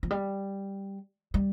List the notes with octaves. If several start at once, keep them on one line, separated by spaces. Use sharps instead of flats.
F3
G3
G3